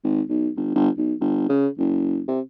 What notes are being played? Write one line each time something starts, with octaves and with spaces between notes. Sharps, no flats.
G#1
B1
G1
G1
B1
G1
C#3
F#1
C3